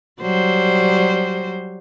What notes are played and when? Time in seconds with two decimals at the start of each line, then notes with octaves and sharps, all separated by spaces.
0.21 F#3 G3 C5